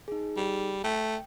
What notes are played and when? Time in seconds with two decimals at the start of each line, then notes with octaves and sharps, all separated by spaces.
0.08 D#4 G#4
0.37 G3
0.84 A3 G5